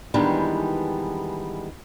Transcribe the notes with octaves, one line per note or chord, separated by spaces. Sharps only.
D#3 E3 G3 G#3 B3 D4